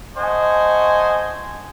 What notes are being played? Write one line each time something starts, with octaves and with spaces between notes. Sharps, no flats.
A3 C5 D#5 F#5 G#5